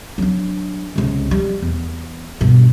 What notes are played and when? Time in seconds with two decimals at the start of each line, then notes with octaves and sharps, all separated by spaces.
0.18 F#3 D4
0.96 C#2 C3
1.31 G3
1.62 E2
2.41 G2 B2